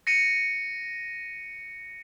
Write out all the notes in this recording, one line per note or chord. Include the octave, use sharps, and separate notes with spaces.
A#6 C#7 D#7